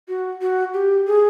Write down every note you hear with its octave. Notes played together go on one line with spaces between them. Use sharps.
F#4
F#4
G4
G#4